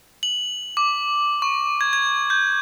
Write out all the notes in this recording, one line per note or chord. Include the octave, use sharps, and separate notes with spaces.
F#7
D6
C#6
G#6
G#6
G6